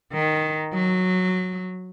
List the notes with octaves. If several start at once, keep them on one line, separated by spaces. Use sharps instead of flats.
D#3
F#3